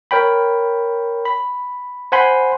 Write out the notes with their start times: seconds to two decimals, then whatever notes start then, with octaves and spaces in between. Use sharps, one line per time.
0.11 A#4 C#5 G5 B5
1.25 B5
2.12 C5 F#5 G#5 B5 C6